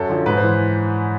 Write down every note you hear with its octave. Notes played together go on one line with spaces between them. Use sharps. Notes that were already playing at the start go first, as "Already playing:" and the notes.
Already playing: F#2 A4
D3 F3
G#2 B4
C5
E3